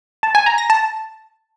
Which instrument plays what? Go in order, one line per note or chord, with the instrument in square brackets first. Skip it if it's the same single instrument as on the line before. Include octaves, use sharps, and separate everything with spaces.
[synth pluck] A5
G#5
A#5
A#6
A5